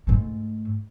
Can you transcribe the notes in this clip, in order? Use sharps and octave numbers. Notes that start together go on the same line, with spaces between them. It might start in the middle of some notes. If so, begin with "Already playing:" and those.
G#2 A3